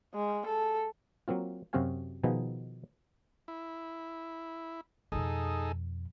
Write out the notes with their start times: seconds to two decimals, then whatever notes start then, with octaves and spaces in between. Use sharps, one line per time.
0.14 G#3
0.46 A4
1.28 F#3 A#3 C4 F4
1.73 F#2 C3 C4 F#4 F5 G#5
2.24 B2 D#3 F3 B3 D#4 G#4
3.48 E4
5.12 F2 B2 D#4 G#4 A4